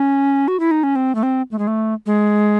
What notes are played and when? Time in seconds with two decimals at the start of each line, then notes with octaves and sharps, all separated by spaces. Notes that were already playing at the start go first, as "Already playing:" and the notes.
Already playing: C#4
0.48 F#4
0.60 E4
0.71 D#4
0.83 C#4
0.96 C4
1.15 A3
1.23 C4
1.51 A3
1.59 G#3
1.67 A3
2.06 G#3